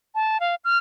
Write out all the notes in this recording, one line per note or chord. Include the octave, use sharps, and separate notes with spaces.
A5
F5
F6